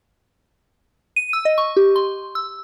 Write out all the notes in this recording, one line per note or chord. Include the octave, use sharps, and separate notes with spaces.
D#7
E6
D#5
C#6
G4
C6
E6